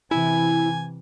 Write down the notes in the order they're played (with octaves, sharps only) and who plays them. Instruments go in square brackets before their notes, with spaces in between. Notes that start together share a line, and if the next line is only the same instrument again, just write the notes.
[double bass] C3 E3 [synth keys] E4 [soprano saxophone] G#5